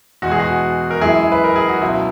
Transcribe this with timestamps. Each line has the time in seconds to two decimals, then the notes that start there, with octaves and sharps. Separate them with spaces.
0.22 E2 B2 G#3 F#4
0.31 G#4
0.39 F#4
0.91 A#4
1.01 F#2 E3 G#3 E4 G#4
1.32 B4
1.44 A#4
1.56 G#4
1.68 F#4
1.81 C#2 B2 F#3 E4